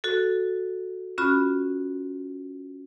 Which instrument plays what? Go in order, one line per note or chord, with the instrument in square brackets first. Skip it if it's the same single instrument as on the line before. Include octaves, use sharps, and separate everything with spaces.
[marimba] F#4 A4
C#4 F4 F#4 B5 F6